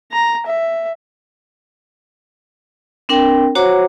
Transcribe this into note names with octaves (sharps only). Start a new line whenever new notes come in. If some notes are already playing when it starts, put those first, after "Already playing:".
A#5
E5
C4 D4 A#4 G5
F#4 C5 C#5 F#5 A#5 D6